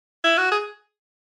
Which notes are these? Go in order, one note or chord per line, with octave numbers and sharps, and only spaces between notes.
E4
F#4
G#4